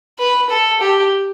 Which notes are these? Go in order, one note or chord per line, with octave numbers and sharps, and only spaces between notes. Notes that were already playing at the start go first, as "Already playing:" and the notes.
B4
A4
G4